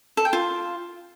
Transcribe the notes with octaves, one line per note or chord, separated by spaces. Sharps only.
A4
G5
F4